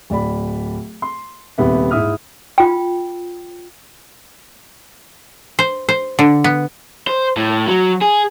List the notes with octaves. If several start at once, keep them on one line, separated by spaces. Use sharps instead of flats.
D1 D5 B5
C6
D#1 D#2 C3 B3 G4 E5
G#2 E4 E5 D#6 F6
F4 G5
C5
C5
D3
B3
C5
A2
F#3
G#4